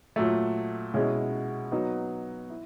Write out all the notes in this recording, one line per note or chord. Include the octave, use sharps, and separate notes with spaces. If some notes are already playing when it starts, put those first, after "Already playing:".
A#2 F#3 A3
B2 G#3 C#4 E4
F#3 B3 D#4
E4